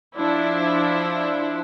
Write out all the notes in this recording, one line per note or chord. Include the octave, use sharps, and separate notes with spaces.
F3 D4 E4